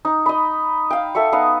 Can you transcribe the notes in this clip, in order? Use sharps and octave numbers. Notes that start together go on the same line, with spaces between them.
D#4
D#5 B5
F5 G5
A4 E5 F#5 C#6
B3 D#4 F5 D#6